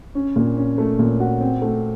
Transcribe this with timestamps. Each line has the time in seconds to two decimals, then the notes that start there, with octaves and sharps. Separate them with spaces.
0.15 C#4
0.36 A#2
0.57 C#4
0.78 A3
0.99 A#2
1.20 F#4
1.41 C4
1.62 A3